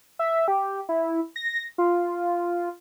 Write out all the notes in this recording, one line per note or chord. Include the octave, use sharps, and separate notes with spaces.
E5
G4
E4
A#6
F4